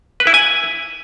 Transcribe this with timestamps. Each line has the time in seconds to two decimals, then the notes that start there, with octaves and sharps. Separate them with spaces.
0.20 B4
0.27 E4
0.34 G#5